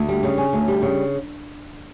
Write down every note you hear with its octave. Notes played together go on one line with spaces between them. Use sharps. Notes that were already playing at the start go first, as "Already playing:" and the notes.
Already playing: D2
G3
C#3
C#4
D2
G3
C#3